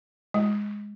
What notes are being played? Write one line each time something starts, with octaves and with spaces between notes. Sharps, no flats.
G#3